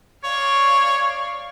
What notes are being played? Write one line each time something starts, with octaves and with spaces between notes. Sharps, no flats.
C#5 D5 F5 C#6